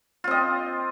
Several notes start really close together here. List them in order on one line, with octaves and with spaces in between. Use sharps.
F4 C4 D#5